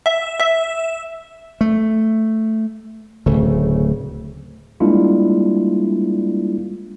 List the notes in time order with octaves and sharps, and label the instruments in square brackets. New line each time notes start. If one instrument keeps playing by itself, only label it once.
[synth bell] E5
E5
[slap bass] A3
D1 C#3 A3
[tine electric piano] G3 G#3 A#3 D4 E4 F4